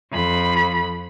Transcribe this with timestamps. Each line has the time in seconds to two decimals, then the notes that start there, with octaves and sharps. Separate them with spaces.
0.12 F2 B5